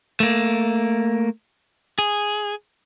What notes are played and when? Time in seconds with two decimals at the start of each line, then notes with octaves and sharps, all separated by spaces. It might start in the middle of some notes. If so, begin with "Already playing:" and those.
0.20 A3 A#3
1.99 G#4